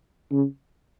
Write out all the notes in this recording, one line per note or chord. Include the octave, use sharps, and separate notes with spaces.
C#3